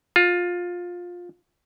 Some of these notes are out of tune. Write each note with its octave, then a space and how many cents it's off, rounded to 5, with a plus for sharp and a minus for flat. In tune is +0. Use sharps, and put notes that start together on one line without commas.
F4 +15